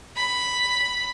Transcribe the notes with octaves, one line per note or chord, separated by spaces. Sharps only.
B5